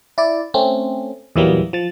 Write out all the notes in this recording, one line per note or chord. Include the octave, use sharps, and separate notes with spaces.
E4 D5
A3 C4 C#4
E2 A#2 E3 F#3 G3 A#3
F3 A6